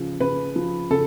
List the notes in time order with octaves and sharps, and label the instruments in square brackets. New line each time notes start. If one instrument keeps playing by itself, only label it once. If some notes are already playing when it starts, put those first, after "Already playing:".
Already playing: [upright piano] C#3 F3
C#3 B4
F3
C#3 A4